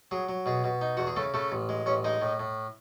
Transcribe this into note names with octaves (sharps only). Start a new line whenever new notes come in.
F#3 G#4
F#3
B2 G#4
B2
D#4
E2 F#4
G#4
C#3 A3 A4
C#3 A3 A4
A1
G#3
A1 C#4 C#5
G#3 D#4 D#5
A2
A2